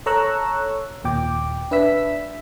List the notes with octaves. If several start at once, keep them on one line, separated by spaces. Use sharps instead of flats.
A4 C#5 A#5 C#6 E6 F#6
D#2 A#2 G5 D6
D4 B4 E5 E6 B6